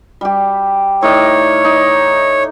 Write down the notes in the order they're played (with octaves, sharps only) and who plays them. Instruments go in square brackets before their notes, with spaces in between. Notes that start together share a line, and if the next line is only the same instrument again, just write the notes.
[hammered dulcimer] G3 G4
[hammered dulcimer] A2 D#4 D5 [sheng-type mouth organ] C#5
[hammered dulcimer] D#4